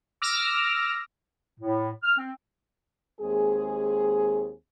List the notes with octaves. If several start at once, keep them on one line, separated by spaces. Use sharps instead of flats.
D6 E6 F6 A#6
A2
F6
C4
D#2 G#3 C4 G#4